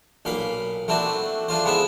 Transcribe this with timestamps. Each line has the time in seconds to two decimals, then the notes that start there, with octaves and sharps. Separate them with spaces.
0.25 B1 A#2 F5 B5
0.88 A3 C4 D4 E4 F#4
1.49 A3 D4 F4 C5
1.65 G#3 B3 E4 C5 E5